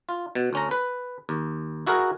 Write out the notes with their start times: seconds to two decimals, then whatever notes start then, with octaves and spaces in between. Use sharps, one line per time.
0.09 F4
0.35 B2
0.53 D2 C#4 A#5
0.71 B4
1.29 D#2
1.87 E4 F#4 G#4 A#4